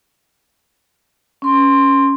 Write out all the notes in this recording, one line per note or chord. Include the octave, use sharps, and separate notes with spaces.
C#4 C6